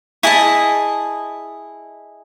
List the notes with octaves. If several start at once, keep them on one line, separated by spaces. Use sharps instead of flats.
E4 G#4 D#5 A5